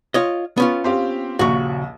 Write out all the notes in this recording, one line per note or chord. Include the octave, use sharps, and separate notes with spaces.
F4 C#5 D#5
B3 C#4 F4
C4 G4 F5
A#1 D#2 C#3 F#4 C#6